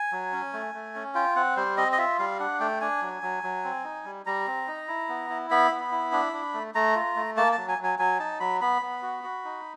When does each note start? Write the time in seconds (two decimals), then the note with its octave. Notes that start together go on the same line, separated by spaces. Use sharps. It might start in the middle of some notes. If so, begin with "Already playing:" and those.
Already playing: G#5
0.12 F#3
0.33 C#4
0.53 A3
0.74 A3
0.95 C#4
1.15 F4 G5
1.36 C4 F#5
1.57 G3 C5
1.77 C4 D#5
1.92 D#5
1.98 F4 E5
2.19 G3 F5
2.40 D4 F#5
2.60 A3 G5
2.81 D4 G#5
3.02 F#3
3.23 F#3
3.43 F#3
3.64 C4
3.84 D#4
4.05 G3
4.26 G3 A#5
4.47 C4
4.67 D#4
4.88 E4
5.09 B3
5.30 E4
5.50 B3 B5
5.71 B3
5.92 E4
6.12 D4
6.33 D4
6.54 A3
6.75 A3 A#5
6.96 F4
7.16 A3
7.37 A#3 A5
7.52 A5
7.58 F#3
7.68 G#5
7.78 F#3
7.84 G#5
7.99 F#3 G#5
8.19 D#4 A5
8.40 F#3 B5
8.61 B3 B5
8.82 B3
9.03 F#4
9.23 F#4
9.44 D#4